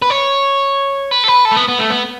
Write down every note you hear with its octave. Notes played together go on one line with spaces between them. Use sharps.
B4
C#5
B4
A4
B4
A4
A3
B3
B3
A3
B3